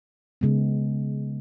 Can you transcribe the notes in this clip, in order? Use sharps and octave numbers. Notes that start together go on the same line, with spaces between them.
C#3 G#3 B3